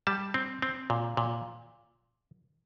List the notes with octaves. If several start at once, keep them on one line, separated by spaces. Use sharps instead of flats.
G3 A5
C4
C4
A#2
A#2